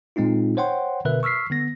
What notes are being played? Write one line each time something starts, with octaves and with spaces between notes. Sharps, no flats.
A#2 G#3 C4 D#4 F4
C5 C#5 F#5 G5 C6
B2 D3 A#4 B4 E5 F#6
C#6 E6 F6 B6 C7
D3 B3 A#6